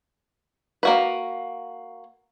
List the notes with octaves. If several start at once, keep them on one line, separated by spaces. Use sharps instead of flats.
A#3 F#4 B4